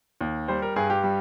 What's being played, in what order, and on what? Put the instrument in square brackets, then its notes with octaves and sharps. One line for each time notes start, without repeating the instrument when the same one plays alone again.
[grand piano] D#2
G3 C5
A#4
G2 G#4
G4
G3